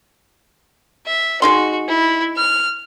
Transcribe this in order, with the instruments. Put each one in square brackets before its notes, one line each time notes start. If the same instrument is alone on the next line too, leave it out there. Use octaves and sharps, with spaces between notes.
[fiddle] E5
[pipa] G#3 D#4 C6 [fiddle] F#4
[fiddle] E4
F6